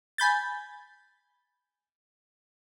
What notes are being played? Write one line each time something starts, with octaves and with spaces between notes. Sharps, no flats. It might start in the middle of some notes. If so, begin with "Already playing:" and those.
G#5 B5 G6 A6